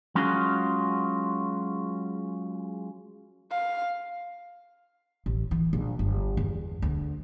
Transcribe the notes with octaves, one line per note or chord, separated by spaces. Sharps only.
F#3 G#3 C#4 F4 F#4 G#4
F5
A1
E3
A#1
G1
E2
D2